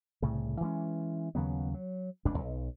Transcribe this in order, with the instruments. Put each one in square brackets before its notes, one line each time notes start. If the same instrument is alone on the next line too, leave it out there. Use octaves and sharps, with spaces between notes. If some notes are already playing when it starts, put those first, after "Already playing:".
[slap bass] C2 A2 C#3
E3 G#3 C#4
D#2 C#3 F#3 B3
F#3
F1 C#2 G2 D4
B1